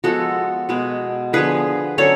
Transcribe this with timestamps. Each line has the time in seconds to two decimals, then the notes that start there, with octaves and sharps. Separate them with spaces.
0.04 F3 G#3 B3 F#4 A4
0.69 B2 G#3 B3
1.33 D3 F3 B3 G#4 B4
1.98 D3 F#3 C#4 A4 C#5